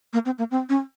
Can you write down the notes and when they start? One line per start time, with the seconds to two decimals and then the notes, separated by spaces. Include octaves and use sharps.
0.13 A#3
0.26 C4
0.39 A#3
0.51 C4
0.69 C#4